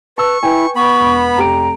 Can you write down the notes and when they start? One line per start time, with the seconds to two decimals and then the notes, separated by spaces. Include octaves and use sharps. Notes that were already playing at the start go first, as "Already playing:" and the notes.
0.18 B4 A5 C#6 E6
0.43 E4 B4 G5 G#5
0.76 B3 B5 C#6
1.00 E1
1.37 F1 G4 A#5 D7